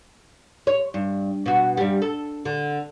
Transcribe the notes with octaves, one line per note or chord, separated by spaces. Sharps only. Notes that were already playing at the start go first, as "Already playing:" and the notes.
C#5
G2
B2 F#4
G2 G3
A4
D3